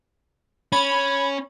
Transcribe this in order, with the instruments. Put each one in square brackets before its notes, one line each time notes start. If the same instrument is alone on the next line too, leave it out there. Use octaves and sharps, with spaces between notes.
[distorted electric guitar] C#4 [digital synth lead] B5